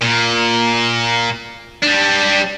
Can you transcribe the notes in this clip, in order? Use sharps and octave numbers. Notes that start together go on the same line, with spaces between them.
A#2
G3 D4